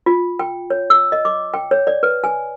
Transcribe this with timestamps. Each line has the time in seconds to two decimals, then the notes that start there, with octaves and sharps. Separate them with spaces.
0.06 F4
0.39 G5
0.70 C#5
0.90 E6
1.12 D#5
1.25 D6
1.54 G5
1.71 C#5
1.87 D5
2.03 B4
2.24 G#5